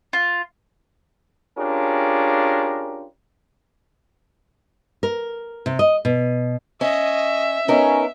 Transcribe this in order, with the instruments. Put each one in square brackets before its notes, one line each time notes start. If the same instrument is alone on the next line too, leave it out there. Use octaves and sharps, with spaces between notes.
[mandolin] F4
[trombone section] C#4 D4 F4 G4 G#4 A#4
[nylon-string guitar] A#4
C3
D#5
B2
[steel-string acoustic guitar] C#4 [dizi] D#5 [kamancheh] E5
[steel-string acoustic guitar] B3 D#4 A#4 [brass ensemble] C#4